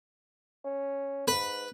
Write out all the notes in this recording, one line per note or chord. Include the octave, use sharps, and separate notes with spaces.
C#4
G#2 B4